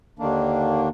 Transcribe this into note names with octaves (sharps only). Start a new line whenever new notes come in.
D#2 D3 D#3 A#3 D4